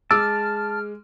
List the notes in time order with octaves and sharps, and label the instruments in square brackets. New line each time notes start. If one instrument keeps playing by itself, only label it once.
[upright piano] G#3 D6 D7 [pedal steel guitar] A5 [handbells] E6 [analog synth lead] F6